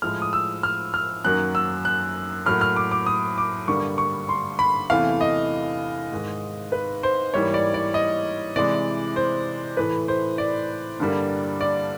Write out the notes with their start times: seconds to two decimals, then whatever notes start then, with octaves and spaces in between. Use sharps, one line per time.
0.02 A2 F3 G#3 F6
0.22 D#6
0.33 E6
0.63 F6
0.94 F6
1.24 F#2 D#3 F#3 A#3 F#6
1.55 E6
1.85 F#6
2.46 A2 F#3 A#3 F6
2.61 F6
2.76 D6
2.91 D6
3.06 D#6
3.38 D6
3.68 G2 D3 G3 A#3 C#6
3.98 C#6
4.29 C6
4.59 B5
4.90 E2 C3 E3 A3 F5
5.21 D#5
6.12 G#2 D#3 G#3
6.72 B4
7.03 C5
7.34 G#2 E3 G3 A#3 C#5
7.54 D5
7.74 D5
7.94 D#5
8.56 C3 E3 G#3 D5
9.16 C5
9.77 A2 E3 A3 B4
10.08 C5
10.38 D5
11.00 G2 D3 G3 A#3
11.61 D5